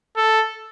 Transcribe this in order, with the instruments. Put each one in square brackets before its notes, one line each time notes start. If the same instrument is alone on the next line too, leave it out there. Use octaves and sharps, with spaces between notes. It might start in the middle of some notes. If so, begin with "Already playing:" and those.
[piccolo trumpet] A4